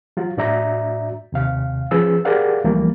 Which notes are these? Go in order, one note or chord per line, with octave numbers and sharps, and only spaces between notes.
F#3 F4 F#4
A2 D4 F#4 D5 E5 A#5
D#2 C3 F5
F3 C#4 G#4 B4 E6
G4 G#4 A#4 D5 F5 F#5
C#2 E3 F3 G3 A3 A#3